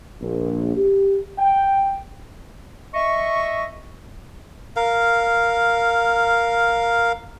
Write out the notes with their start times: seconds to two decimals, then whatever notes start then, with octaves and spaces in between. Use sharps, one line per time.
0.21 A#1
0.77 G4
1.38 G5
2.94 D#5 E5 C#6
4.76 A#4 F5